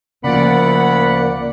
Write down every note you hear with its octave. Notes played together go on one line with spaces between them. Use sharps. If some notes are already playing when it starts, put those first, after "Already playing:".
D2 C#3 F3 A#3 D5 F#5 B5